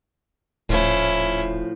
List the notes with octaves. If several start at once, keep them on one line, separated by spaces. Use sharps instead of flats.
D#1 A2 F3 C#4 E4